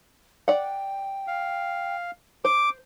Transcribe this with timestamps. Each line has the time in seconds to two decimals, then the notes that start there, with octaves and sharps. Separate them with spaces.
0.48 D5 F#5 G5
1.27 F5
2.45 C5 D6